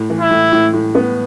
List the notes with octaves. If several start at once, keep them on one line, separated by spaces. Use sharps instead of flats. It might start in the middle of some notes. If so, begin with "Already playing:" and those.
Already playing: A2
E3
E4
A2
A2
A2
B3